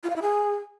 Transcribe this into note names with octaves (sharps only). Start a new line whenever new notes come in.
F4
F5
E4
G#4